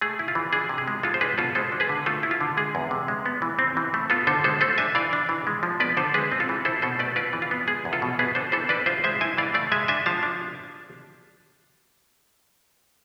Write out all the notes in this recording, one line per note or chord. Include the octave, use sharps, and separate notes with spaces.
A3 G#4
E4
F4
E3
D4 G#4
C3
G#4
G#3
G#3 F4 A4
C5
D4 G#4 B4
B2 F4 A4
G#3 A4 C5
D4
G#4 B4
D3
A3 F4 A4
E4
F4
D3
G#3 G#4
E2
C3
G#3
B3
E3
C4
E3
A3
B3 F4 A4
D3 A4 C5
G#3 A4 C5
A3 A4 C5
D4 E5 G#5
E3 D5 F5
D4
E3
G#3
F3
B3 B4 D5
D3 A4 C5
G#3 G#4 B4
C4
F4 A4
E3
E4 A4 C5
B2 A4 C5
A3 B4 D5
F4 B4 D5
E3
F4
B3
G#3 G#4
E2
F4 A4
B2
B3 G#4 B4
D4 A4 C5
E3 A4 C5
D4 B4 D5
F4 C5 E5
G#3 C5 E5
E4 E5 G#5
E3 D5 F5
A3 D5 F5
G#3 E5 G#5
D4 E5 G#5
F3 F5 A5
D4